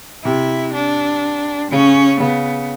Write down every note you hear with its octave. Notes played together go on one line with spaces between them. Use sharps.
C3 E4
D4
C#3 C#4
C#3 B3